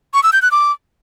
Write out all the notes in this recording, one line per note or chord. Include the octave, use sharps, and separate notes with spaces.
C#6
E6
G6
F#6
D6